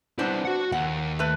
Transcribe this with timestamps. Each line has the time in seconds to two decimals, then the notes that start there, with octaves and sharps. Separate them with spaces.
0.19 B3 C4 D4 E4 C5
0.45 F#4 F#5
0.72 D#2 F#5
1.19 A3 B4